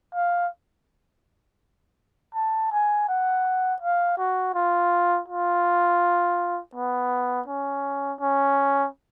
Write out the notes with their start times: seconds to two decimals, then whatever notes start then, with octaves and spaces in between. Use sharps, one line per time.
0.15 F5
2.34 A5
2.71 G#5
3.09 F#5
3.82 F5
4.18 F#4
4.54 F4
5.28 F4
6.75 B3
7.48 C#4
8.21 C#4